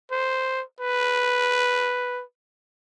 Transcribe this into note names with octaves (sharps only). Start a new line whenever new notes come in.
C5
B4